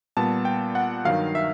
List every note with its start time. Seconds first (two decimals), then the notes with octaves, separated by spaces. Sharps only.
0.17 A#2 G3 B3 A5
0.45 G5
0.75 F#5
1.05 G2 D#3 F#3 F5
1.35 E5